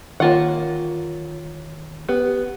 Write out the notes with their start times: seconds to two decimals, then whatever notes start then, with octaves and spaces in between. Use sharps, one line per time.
0.20 D#3 A#3 F4 C#5 F#5
2.09 B3 G4